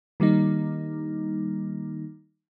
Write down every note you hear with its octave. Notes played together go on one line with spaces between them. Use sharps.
D#3 G3 A#3 D#4